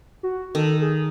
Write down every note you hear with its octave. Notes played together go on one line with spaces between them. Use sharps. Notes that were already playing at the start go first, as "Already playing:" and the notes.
F#4
D#3 A4
G#4